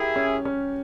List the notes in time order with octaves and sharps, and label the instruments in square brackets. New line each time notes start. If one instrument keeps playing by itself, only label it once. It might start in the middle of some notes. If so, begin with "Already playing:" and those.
Already playing: [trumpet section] E4 G#4 [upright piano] G4 A#4
[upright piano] C#4
C#4